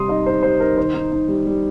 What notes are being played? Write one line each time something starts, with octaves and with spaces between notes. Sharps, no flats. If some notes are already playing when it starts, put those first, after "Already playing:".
Already playing: C3 G3 C6 D#6
D#4 D#5
D#4 C5
G3 C5
D#4 A#4
D#3 C5
D#4
D#4
G3
G3